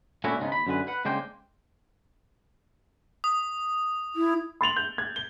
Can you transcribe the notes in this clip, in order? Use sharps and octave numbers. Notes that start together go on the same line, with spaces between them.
A#2 A3 C#4 D4 E4 F#4
G#2 C#3 G#3 A#3 B3 D#4
D#2 B5
F#2 D3 G#3 B4
B4 F#5
C#3 G#3 A#3 D4 C5 G5
D#6
E4
C6 A6 F7 F#7
G6
G#6
G7